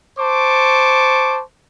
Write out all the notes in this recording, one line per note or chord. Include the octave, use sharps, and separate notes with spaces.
C5 A5 C#6 D6